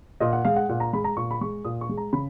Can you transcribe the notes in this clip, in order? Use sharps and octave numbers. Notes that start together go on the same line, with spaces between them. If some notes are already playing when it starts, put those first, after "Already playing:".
A#2 D#5
F#5
G#3 F5
F#5
A#2 F#5
A#5
G#3 B5
A#5
A#2 C#6
B5
G#3 C#6
A#2 D#6
C#6
G#3
A#5
C#3 B5